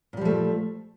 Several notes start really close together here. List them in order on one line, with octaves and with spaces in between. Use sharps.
A#2 G3 F3 A3